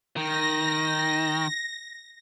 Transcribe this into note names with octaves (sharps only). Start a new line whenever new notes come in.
D#3 A#6